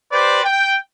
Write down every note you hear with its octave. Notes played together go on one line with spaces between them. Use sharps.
G4 B4 C5 D5
G5